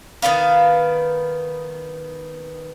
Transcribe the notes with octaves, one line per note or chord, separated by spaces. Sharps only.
D#3 B3 B4 F5